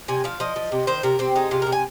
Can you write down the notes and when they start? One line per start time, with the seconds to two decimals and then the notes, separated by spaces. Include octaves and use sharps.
0.08 C3 G#5
0.24 F3 F5
0.40 F3 D#5
0.56 F3
0.72 C3
0.87 D#3 C5
1.03 C3 A#4
1.19 C3 C4
1.36 G#3 D#4
1.51 C3 F4
1.62 C3 A#4
1.72 G#5